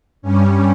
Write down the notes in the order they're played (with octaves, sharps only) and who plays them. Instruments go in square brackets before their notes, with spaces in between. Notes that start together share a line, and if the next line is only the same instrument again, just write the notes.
[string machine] G2 G3 C#4